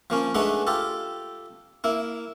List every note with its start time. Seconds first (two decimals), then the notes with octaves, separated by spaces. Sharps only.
0.10 F3 A#3 C#4
0.34 G#3 A3 D4 D#4 B4 F#5
0.67 F4 G4 A4
1.84 A#3 E4